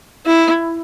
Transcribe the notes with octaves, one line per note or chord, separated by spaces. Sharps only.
E4